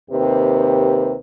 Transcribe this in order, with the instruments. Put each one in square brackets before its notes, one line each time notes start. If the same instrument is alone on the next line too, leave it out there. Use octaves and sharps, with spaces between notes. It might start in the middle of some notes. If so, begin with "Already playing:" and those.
[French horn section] D#2 C3 G4 B4